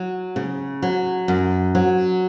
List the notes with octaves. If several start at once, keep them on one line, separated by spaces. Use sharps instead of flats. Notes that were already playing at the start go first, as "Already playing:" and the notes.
Already playing: F#3
C#3
F#3
F#2
F#3